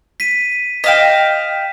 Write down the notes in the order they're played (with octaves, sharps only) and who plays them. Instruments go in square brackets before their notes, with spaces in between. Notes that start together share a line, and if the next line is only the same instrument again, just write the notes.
[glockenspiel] B6 D#7
[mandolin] D#5 F5 G5 [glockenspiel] B6 E7